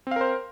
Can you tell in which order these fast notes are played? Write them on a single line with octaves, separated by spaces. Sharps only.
C4 F5 A#4 C5